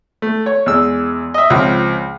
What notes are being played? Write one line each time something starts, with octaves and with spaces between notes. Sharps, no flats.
A3
C#5
E2 G#3 E6
D#5 E5
C#2 F3 C4